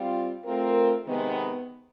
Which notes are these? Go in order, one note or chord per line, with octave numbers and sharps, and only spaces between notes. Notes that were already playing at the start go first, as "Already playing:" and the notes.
Already playing: G3 C4 F4
A3 C4 F4 A#4
C3 D#3 G#3 B3